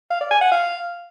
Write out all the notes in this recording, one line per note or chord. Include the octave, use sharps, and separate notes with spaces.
F5
D5
G#5
F#5
F5